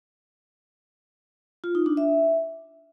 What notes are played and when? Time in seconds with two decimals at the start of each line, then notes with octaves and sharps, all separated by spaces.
1.64 F4
1.75 D#4
1.86 D4
1.97 E5